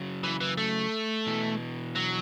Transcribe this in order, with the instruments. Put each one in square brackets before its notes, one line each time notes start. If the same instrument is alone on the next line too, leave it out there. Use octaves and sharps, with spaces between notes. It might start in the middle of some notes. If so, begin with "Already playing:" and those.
Already playing: [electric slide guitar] C#3 F#3
[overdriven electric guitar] E3
E3
A3
[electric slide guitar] B2 E3
[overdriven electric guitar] F#3